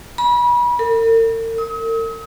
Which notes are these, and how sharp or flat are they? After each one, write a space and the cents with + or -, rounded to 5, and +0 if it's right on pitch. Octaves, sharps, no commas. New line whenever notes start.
B5 -35
A#4 -45
D#6 +45